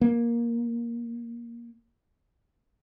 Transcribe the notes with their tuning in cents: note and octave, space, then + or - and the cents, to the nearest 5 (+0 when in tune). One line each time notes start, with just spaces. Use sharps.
A#3 +10